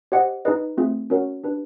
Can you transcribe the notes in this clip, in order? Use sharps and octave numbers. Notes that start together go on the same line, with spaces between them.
G4 C5 D#5 F#5
D#4 G#4 B4 D#5
A3 C4 F4 G#4
C#4 F#4 A#4 C#5 F#5
D4 G4 B4